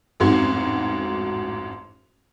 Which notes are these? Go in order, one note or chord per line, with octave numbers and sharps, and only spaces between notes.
A1 F2 G#2 F#4 C6 G#6